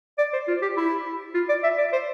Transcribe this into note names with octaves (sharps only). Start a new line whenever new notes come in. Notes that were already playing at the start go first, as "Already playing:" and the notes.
D5
C5
F4
G4
E4
F4
D5
E5
D5
C5